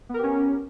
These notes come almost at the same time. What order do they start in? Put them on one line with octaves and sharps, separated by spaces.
B3 A#4 G4 C#4